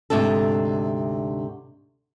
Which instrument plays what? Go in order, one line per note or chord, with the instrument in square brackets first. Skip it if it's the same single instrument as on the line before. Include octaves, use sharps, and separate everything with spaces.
[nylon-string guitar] D2 G#2 C3 D4 A4